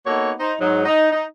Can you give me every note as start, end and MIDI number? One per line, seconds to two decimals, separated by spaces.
0.07 0.33 58
0.07 0.33 59
0.07 0.33 63
0.07 0.33 66
0.07 0.33 69
0.07 0.33 73
0.40 0.54 63
0.40 0.54 72
0.60 0.82 44
0.60 0.82 54
0.60 0.82 63
0.85 1.10 63
1.12 1.25 63